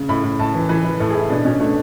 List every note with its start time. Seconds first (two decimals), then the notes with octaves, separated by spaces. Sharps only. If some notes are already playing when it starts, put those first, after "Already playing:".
Already playing: C#3
0.09 A2 B5
0.23 A2
0.39 A2 A5
0.54 E3
0.69 E3 B4
0.84 E3
1.00 A2 A4
1.10 G#4
1.15 A2
1.20 E4
1.30 B2 D4
1.45 B2 C#4
1.60 A3 D4